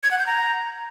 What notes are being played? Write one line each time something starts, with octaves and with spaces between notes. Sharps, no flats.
G#6
F#5
G6
A#5